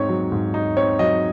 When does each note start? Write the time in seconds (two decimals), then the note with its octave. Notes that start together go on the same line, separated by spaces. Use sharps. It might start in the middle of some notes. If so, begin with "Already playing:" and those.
Already playing: G#2 C4 D#4 C#5
0.09 F#3
0.32 G#2
0.54 D#4
0.77 C4 C#5
0.99 F#3 D#5